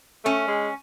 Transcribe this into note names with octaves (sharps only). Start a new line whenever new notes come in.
A3 C#4
G#3